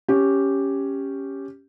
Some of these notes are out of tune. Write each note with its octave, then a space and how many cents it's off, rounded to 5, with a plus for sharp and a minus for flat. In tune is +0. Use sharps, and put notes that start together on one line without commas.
C#4 +0 G4 +0